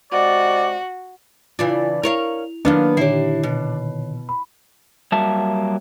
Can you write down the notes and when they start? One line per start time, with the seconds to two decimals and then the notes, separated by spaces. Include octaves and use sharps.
0.12 C3 G#3 F#4 D5
1.59 C#3 E3 D4 F4
2.03 E4 A#4 C#5 F5 F7
2.65 D#3 F#3 A#3 B3 D4
2.97 A#2 D3 D#3 E4 G4 C#5 C7
3.43 B2
4.29 B5
5.12 F#3 G3 A#3 E5 A5